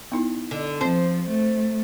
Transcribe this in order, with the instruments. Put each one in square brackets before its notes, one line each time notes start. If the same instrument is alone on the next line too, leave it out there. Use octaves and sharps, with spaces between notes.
[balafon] B3 D#4 E4
[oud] D3
[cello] F3 [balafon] C4 [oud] C5
[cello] A3